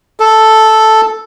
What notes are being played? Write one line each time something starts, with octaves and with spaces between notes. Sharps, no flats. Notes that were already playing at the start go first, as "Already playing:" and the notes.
A4